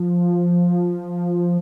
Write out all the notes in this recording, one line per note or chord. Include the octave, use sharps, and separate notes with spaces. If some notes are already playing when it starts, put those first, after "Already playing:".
Already playing: F3